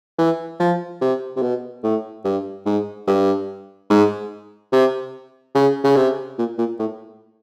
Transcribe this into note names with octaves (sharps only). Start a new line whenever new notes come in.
E3
F3
C3
C3
B2
A2
G2
G#2
G2
G#2
C3
C#3
C#3
C3
A#2
A#2
A2